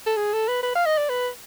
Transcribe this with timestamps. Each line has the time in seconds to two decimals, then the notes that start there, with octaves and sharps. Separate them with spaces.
0.07 A4
0.16 G#4
0.33 A4
0.48 B4
0.63 B4
0.75 F5
0.86 D#5
0.97 D5
1.09 B4